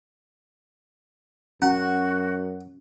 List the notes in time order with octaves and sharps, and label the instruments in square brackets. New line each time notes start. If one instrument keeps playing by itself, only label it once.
[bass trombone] F#2 [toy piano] C#4 [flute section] F#4 [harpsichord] F#5